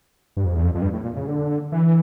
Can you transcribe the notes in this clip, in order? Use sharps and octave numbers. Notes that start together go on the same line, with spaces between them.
G2
F2
E2
F2
F2
G2
A2
A#2
C#3
D3
E3